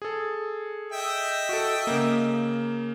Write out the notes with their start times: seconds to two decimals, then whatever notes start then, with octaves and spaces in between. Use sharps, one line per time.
0.02 G#4 A4
0.92 D#5 E5 G5
1.49 F#4 A4
1.87 C#3 A#3